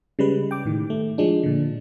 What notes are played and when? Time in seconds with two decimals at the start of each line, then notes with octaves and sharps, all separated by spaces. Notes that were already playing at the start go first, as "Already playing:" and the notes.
0.19 C#3 G3 G#3 B4
0.51 G5 D6
0.65 A2 D#3
0.90 A3
1.18 F3 G#3 D4
1.43 A#2 D3